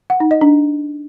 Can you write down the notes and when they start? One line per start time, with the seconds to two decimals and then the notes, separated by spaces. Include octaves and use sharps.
0.10 F#5
0.20 D#4
0.31 D#5
0.41 D4